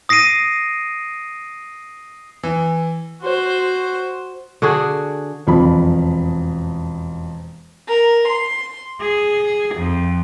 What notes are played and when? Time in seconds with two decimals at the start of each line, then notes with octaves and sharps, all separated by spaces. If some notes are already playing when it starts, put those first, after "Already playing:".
0.09 D#6 A#6 C7 D7 D#7
2.43 E3
3.22 F#4 C5
4.62 D3 D4 F#4 G#4
5.47 E1 F2 F3 B5
7.87 A#4
8.27 C6
9.00 G#4
9.75 F2